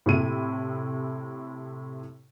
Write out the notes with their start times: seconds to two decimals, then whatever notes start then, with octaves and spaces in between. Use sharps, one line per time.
0.06 A2 C3 E4 D#7